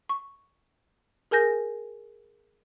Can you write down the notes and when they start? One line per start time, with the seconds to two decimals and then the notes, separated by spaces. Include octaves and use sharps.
0.09 C#6
1.31 G#4 A#4 G#5 G6 A#6